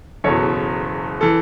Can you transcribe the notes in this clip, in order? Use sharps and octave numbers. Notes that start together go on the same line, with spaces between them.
F#1 E2 B2 A4 C#5
E3 A4